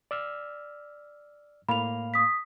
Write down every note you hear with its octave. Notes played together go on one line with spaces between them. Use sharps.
D5 E6 F6
A2 A#3 F5 B5 F7
D#6 B6